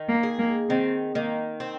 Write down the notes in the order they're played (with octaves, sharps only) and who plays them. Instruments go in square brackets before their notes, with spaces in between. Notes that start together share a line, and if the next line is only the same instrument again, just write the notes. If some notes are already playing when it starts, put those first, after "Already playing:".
Already playing: [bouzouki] D#3
[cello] A#3
[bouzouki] G#4
[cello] A#3
[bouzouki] D#3 [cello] C4
[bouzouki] D#3 [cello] A#3
[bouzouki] C4